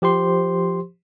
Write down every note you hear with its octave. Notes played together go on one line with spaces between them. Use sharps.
F3 G4 C5 C6